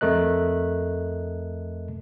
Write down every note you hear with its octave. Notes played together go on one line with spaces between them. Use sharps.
F2 A3 A#4 D#5 F#6